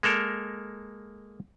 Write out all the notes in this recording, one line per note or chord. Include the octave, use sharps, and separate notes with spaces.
G#3 A#3 A4 A#4